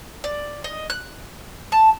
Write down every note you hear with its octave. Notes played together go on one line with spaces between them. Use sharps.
D5
D#5
F#6
A5